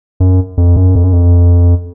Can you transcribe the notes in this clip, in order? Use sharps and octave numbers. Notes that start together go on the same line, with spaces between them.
F#2
F2
F#2
F2
F#2
F2